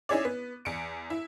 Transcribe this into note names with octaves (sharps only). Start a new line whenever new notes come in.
C#4 D#4 E4 G#4 C#5 D5
B3
E2 C#7 D7
E4